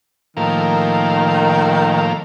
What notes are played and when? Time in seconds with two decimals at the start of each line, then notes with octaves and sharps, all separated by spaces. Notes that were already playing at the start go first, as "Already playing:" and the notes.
0.37 A2 D#3 F3 A#3